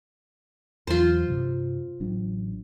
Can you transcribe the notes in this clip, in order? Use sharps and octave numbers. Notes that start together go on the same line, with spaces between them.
E2 E3 F#3 F4 C5
G2 C3
A1 F#3 D4